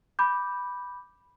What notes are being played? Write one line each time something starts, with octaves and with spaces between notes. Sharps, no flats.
B5 D6 G6